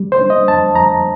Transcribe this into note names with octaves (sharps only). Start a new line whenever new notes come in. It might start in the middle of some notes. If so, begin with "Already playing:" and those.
Already playing: G3
C5
D4
D#5
F2 A5
F2 A#5